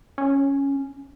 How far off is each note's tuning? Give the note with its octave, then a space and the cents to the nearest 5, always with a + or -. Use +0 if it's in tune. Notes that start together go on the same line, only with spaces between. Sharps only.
C#4 +0